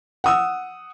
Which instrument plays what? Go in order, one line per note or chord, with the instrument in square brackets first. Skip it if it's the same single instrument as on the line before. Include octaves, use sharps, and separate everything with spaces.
[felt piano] F#5 D#6 E6